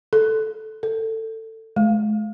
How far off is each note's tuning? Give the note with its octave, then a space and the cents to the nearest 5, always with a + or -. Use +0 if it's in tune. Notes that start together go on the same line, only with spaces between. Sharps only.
A4 -5
A4 +20
G#3 +40